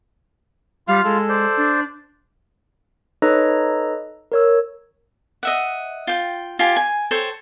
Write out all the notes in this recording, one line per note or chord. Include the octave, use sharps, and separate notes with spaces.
G3 F4 F5 F6
G#3 A4
C5 D5
D4
D#4 A4 B4 C#5 D#5 A#5
A#4 C#5 E6
D#5 E5 F#5
F4 G5
F4 G4 G#5
G#5
A4 C5 C#5 G5